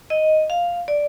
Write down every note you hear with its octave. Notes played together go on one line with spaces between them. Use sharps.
D#5
F5
D5